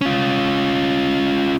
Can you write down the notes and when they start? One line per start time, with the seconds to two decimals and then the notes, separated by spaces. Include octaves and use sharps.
0.01 C#4 F4